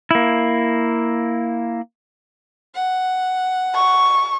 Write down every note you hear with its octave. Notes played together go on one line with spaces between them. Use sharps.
A#3 E4
F#5
C#6